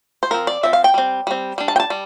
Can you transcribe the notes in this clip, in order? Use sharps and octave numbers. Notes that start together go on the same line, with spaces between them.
C5
F3 C4 A#4
D5
F3 C4 E5
F5
G5
G3 C4
G3 C4
G3 D4
A5
G5
A5
G3